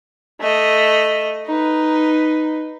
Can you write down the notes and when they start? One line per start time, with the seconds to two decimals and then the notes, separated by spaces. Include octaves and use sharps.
0.41 A3 D#5
1.46 D#4 B4